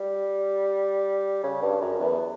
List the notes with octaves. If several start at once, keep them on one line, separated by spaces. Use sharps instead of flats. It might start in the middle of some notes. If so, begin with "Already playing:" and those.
Already playing: G3
C#3
G2
F#2
E2